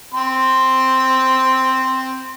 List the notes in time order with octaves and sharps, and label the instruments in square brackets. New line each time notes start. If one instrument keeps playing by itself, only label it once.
[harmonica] C4 C6